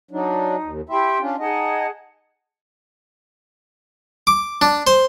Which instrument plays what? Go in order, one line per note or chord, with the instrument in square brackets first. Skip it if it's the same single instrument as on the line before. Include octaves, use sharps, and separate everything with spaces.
[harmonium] F#3 D4 [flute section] D#4
[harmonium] D#2
[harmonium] E4 E5 [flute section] G4 G5 C6
[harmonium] C#4 D4 F4
[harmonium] D#4 D#5 [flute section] G#4 F#5 A5
[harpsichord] D6
D4
C5